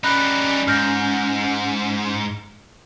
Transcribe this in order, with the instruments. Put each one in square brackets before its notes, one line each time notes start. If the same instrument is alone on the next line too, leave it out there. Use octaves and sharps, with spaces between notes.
[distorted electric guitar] G3 D#4 [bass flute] C#4 [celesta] B5 F#6
[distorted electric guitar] G#2 [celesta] F6 G6 A#6